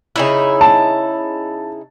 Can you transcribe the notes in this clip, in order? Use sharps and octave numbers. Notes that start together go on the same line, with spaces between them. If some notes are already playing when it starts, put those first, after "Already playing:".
C#3 D#4 E4
A5